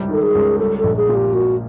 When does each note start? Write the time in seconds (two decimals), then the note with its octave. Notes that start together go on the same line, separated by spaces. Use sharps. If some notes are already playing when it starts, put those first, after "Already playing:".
Already playing: C#2 C3 G3
0.09 D#3 A4
0.22 G#4
0.35 C#2
0.59 G3 A4
0.78 A4
0.83 A#1
0.97 G#4
1.09 A#2
1.15 G4
1.34 A#3 F#4